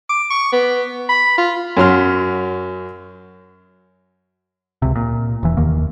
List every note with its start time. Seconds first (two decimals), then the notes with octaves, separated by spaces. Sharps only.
0.10 D6
0.31 C#6
0.52 B3
1.09 B5
1.38 F4
1.77 F#2 F#3 C6 F6
4.82 C#2 C3
4.95 A#2
5.43 E1 E3
5.57 F1 D#2 D#3 A#3